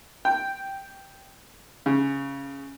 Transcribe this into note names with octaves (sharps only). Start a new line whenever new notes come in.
G5
C#3